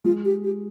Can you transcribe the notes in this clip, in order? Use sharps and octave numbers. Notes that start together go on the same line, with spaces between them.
G#3 F4
G4
G4